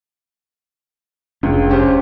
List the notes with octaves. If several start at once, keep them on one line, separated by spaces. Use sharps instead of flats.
F1 C#2 D4
C#4 G4 C5